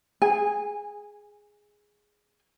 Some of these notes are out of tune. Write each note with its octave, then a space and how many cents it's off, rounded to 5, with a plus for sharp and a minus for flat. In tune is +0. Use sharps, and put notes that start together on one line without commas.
G#4 +0 G#5 -25